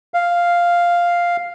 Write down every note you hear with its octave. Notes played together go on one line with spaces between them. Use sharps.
F5